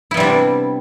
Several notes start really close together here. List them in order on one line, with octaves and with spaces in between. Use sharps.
E4 B3 G3 C3 D4